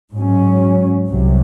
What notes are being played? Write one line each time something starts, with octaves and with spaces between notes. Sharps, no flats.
G#2 F#3 C#4
C2 C3 F#3